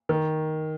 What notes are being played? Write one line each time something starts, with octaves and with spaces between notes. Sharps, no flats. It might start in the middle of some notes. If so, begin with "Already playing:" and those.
D#3